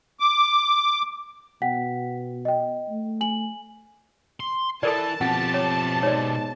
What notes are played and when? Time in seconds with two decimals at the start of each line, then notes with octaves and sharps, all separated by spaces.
0.20 D6
1.62 B2 F#5 G5 B6
2.45 D#5 G5
2.89 A3
3.21 G#5 F#7
4.40 C6
4.83 E3 A4 A#4 D5 A5
5.21 F2 B2 G4 F#5
5.54 C#5
6.03 G#2 C#5 D5